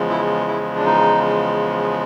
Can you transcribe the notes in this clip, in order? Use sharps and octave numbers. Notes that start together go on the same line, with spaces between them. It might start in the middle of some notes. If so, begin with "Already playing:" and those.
Already playing: E2 C#3 F3 G#3
E4
E4
D4
D#4